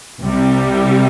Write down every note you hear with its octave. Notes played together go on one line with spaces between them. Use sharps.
C2 C3 G3